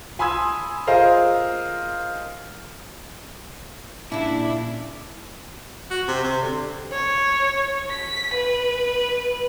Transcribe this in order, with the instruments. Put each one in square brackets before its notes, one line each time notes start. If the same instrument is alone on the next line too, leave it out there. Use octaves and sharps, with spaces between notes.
[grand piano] G#5 B5 C6 D#6 E6 G#6
F4 G#4 A#4 C5 D#5 F5
[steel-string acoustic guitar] A#2 C#3 [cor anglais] D4 [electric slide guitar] E4
[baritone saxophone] F#4
C3
C3
D3
[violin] C#5
B6
B4